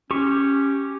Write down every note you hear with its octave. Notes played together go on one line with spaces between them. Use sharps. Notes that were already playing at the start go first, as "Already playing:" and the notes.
C#4 G4 C#6